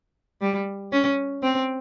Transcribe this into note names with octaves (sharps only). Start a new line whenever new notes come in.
G3
C#4
C4